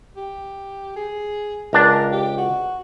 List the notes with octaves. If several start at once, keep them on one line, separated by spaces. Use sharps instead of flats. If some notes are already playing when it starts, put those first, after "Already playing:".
G4
G#4
C#2 D4 A#4
G4
F#4